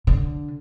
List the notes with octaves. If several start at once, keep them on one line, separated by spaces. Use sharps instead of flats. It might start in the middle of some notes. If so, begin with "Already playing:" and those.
D3